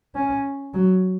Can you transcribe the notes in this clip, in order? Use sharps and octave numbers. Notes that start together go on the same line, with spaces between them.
C#4
F#3